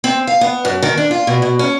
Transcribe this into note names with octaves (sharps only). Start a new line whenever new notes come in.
C4
F5
B3
F#2
D#3
D4
F4
B2
B2
C#4